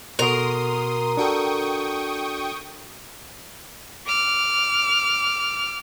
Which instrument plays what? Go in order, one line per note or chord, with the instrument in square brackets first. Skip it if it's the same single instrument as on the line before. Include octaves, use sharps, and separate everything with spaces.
[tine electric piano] B2 F#4 [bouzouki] A#4 [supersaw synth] C6 D#6
[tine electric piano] D4 F#4 A4 [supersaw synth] G5 C#6 D#6
[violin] D6 F6